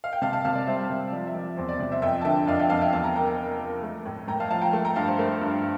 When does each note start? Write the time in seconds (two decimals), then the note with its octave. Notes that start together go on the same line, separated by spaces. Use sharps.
0.04 F5
0.13 G5
0.22 C3 F5 A5
0.33 F5 A5
0.45 C3 F5 A5
0.55 D5
0.67 G3 C5 E5
0.90 C3 C5
1.12 F3 D5
1.27 E5
1.34 F3 D5
1.57 E2 C5
1.69 D5
1.79 C3 D5
1.92 C5 E5
2.02 F2 E5 G5
2.21 A5
2.25 D3 E5 G5
2.47 F2 D5 F5
2.59 E5 G5
2.70 F2 F5 A5
2.81 E5 G5
2.93 E2 F5 A5
3.04 G5 A#5
3.15 A#3 G5 A#5
3.27 G5 A#5
3.39 A#3
3.60 A#3
3.83 A3
4.06 A2
4.28 A2 G5 A#5
4.40 F5 A5
4.51 F3 F5 A5
4.62 G5 A#5
4.73 A3
4.85 G5 A#5
4.96 G2 F5 A5
5.08 C5
5.18 A3 C5
5.41 G2